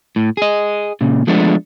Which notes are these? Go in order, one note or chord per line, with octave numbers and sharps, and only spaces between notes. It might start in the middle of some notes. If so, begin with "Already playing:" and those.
A2
G#4 D#5
A#2 C#3
F3 G#3 A3 B3 D4